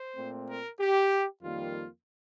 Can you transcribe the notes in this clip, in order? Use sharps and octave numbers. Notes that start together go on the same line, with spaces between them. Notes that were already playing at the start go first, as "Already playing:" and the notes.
Already playing: C5
A#2 A3 C4
A#4
G4
F2 D#3 G3 A#3 F4